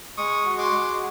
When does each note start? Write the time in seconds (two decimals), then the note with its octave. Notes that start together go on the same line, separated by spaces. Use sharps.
0.17 G#3 C#6 D#6
0.45 F#4
0.58 C6 D6
0.73 G#3